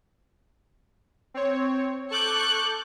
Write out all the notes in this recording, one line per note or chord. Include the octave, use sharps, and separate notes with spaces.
C4 C#5
A4 C#6 D6 F#6 G6